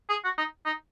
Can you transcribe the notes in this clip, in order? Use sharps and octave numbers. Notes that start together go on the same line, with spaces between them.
G#4
F#4
D#4
D#4